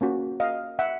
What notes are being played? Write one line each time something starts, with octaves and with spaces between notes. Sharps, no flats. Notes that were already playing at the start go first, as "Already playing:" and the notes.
A#3 C#4 F#4
D#5 F5
E5 F#5